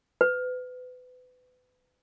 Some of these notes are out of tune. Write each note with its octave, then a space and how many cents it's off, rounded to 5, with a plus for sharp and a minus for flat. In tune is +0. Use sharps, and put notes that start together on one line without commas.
B4 +30